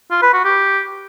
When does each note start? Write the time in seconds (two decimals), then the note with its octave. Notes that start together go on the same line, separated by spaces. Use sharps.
0.11 F4
0.22 B4
0.33 F#4
0.45 G4